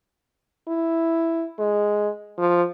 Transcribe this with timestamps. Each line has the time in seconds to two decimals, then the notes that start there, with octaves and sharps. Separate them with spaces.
0.68 E4
1.59 G#3
2.38 F3